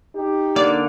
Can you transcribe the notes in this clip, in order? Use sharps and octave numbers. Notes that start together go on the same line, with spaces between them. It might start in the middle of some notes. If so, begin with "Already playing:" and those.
D#4 G4
D3 A#3 D5